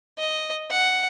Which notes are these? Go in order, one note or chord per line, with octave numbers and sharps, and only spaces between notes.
D#5
F#5